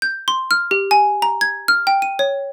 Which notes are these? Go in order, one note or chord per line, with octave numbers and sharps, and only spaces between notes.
G6
C6
F6
G4
G#5
A#5
G#6
F6
G5
D#7
C#5